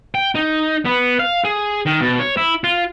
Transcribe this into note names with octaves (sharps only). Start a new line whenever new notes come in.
G5
D#4
B3
F5
G#4
D#3
B2
C#5
E4
F4